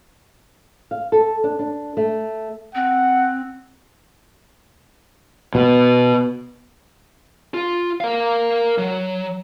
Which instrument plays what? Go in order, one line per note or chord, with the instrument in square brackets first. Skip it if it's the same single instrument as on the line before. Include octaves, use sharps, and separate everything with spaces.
[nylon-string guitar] F5
A4
D4
D4
A3
[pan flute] C4 [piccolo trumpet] F#5
[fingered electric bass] B2
[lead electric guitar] F4
A#4 F5
F#3